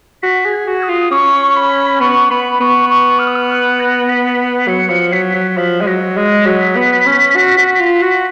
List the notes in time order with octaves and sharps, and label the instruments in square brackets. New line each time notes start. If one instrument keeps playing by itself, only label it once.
[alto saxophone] F#4 [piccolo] B6
[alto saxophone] G#4
[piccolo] G#6
[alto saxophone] F#4
[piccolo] D#6
[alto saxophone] F4
[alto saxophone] C#4 [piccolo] C#6
[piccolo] B5
[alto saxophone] B3 [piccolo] C#6
[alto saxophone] B3 [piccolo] B5
[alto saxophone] B3 [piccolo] C#6
[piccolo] C#6
F6
D#6
F6
F#6
A#6
B6
B6
[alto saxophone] F#3 [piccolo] C#7
[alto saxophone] F3
[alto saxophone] F#3 [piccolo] B6
[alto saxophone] F#3
[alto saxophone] F3 [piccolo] B6
[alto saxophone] G#3
[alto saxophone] F#3 [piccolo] A#6
[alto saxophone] G#3 [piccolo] A#6
[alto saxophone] F#3 [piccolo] B6
[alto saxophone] B3
C#4
F#4
F#4
F4
F#4